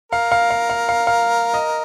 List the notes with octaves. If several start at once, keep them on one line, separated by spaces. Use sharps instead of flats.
A#4 F5
F5
F5
F5
F5
F5
D#5